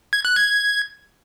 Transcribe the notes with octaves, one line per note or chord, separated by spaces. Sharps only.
G#6
F#6
G#6